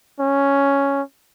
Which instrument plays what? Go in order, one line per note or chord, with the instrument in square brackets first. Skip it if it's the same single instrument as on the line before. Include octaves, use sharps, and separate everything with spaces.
[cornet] C#4